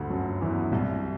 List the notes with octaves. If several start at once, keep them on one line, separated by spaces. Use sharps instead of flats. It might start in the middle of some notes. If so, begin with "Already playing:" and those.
Already playing: D2 G2 D3
F#2 F#3
E2 E3
C2 C3